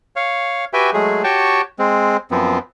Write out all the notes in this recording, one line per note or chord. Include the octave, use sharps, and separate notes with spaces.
C#5 F5
F#4 G4 B4 E5 G5 G#5
F#3 G#3 A3 G#4
F#4 G4 C#5 G5 A5
G#3 C4
F#2 F3 B3 C4